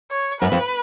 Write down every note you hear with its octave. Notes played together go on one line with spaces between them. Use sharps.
C#5
F#2 B4
F2